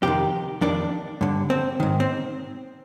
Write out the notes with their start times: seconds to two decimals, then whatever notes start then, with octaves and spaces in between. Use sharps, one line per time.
0.03 F2 C3 D#3 G4
0.61 F2 D#3 D4
1.21 G2 D3
1.50 C4
1.80 G#2 D#3
2.00 C4